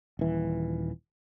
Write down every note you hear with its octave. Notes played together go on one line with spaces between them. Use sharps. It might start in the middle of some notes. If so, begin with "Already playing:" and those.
D#1 E3